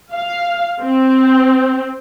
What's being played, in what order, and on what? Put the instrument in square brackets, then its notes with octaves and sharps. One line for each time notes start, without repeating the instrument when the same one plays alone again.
[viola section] F5
C4